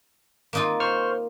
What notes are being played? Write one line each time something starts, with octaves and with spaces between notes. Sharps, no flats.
A#3 D#4 F4
C5 C#6 F6